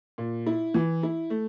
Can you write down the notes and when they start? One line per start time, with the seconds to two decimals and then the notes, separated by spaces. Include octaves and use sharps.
0.18 A#2
0.46 E4
0.74 E3
1.03 E4
1.30 A3